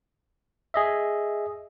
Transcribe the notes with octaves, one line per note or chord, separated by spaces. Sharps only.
G#4 D#5 E5